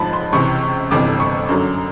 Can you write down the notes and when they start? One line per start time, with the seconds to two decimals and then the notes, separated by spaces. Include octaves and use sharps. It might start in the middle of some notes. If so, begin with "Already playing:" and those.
Already playing: A1 G#2 F3 A5 B5
0.13 C6
0.33 C#2 C3 E3 C#6
0.91 G1 F2 C3 E3 D6
1.20 C#6
1.49 F#2 D3 F#3